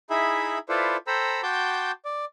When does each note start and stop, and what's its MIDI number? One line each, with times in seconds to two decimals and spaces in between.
0.10 0.58 63
0.10 0.58 64
0.10 0.58 68
0.10 0.58 76
0.10 0.58 83
0.69 0.97 64
0.69 0.97 65
0.69 0.97 69
0.69 0.97 71
0.69 0.97 72
0.69 0.97 74
1.07 1.41 69
1.07 1.41 72
1.07 1.41 79
1.07 1.41 82
1.07 1.41 83
1.07 1.41 88
1.43 1.92 66
1.43 1.92 79
1.43 1.92 81
1.43 1.92 84
1.43 1.92 86
1.43 1.92 91
2.05 2.25 74